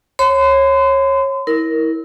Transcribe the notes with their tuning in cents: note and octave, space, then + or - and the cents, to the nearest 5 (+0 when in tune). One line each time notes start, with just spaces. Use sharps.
C#5 -25 C6 -40
E4 -25 A#4 +0